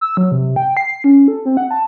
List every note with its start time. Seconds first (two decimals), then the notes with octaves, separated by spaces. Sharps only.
0.01 E6
0.17 F#3
0.32 C3
0.56 G5
0.77 C7
1.04 C#4
1.28 A4
1.45 C4
1.57 F#5
1.71 A5